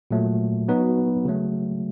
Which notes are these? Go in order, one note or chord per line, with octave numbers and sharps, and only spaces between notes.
A#2 F#3 A3
F#3 B3 D#4 F#4 B4
C#3 F#3 A3